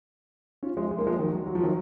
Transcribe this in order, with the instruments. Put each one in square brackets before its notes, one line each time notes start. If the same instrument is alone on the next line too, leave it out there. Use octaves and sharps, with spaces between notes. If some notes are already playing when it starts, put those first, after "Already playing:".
[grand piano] C#4 F4
F3 G#3
G#3
A#3
F3 G#3
D#3 F#3
F#3
F3
D#3 F#3